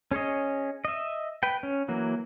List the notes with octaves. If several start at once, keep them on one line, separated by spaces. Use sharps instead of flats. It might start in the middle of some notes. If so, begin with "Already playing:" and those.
C#4 G#4 C#5 D#5
D#5 E5
B4 G5
C#4
E3 F#3 A#3